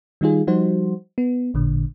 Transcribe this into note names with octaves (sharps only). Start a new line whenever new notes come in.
D#3 G3 D#4 F4 G#4
F3 G3 D#4 F#4 C5
B3
A1 A#2 D3